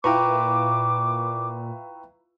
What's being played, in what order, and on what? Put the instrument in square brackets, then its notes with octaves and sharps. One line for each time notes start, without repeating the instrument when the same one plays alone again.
[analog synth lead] A#2 [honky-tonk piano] E4 F4 B4 [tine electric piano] G5 A#5 C#6 [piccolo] D6